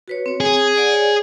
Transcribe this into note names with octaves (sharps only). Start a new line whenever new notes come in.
F#4 B4 C#5
C4 C#5
G#4
D5 F#5 G#5
C#5 D5